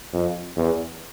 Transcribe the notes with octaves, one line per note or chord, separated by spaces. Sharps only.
F2
E2